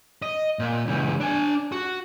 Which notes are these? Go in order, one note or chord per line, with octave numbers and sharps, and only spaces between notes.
D#5
A#2
C#2 E3
D4 G#5
F#4